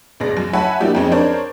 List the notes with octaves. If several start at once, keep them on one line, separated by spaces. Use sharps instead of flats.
C#2 B2 G#3 D5 A#6
F#2
C#5 E5 F#5 G#5 A5 B5
F3 F#3 A#3 D4 E4 G4
F2 G#3 C4 C#4 D#4
D4 A#4 C5 C#5